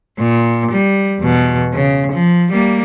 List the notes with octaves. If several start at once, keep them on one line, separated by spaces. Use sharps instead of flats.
A#2
G3
E2 B2
C#3
F3
G3 A#3